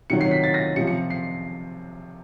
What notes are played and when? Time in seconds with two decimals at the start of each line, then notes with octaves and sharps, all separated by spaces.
0.10 C3 D#3 F#3 C#7
0.21 C7
0.31 B6
0.44 A6
0.54 A#6
0.76 C3 F3 C#7
0.87 C#7
1.10 C7